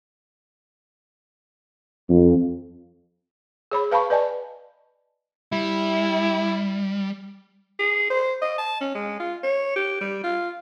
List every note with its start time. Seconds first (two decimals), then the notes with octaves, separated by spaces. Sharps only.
2.09 F2
3.72 G#4 C#5 B5
3.91 B4 F5 A5 B5 C#6
4.10 B4 D5 D#5 G#5 A5
5.52 G3 E4
7.79 G#4
8.10 C5
8.42 D#5
8.58 A5
8.81 C#4
8.95 G#3
9.20 F4
9.43 C#5
9.76 G4
10.01 G3
10.24 F4